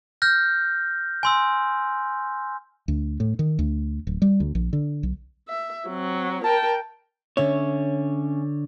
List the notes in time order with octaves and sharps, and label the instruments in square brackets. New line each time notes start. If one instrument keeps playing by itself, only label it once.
[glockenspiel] F6 G6 A#6
G#5 C6 E6
[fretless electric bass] D2
A2
D#3
D2
D1
G3
D2
A#1
D3
B1
[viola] E5
F#3 C4
[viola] A#4 G5 [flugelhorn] A5
[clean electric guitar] D3 C#5 [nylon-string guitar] C#4 E5